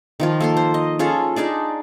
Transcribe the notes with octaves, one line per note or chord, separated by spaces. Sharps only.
D#3 F3 F4
A#3 A4 C6
C5
D#5
C#4 F4 G#4 A4
D4 D#4 G#4 D5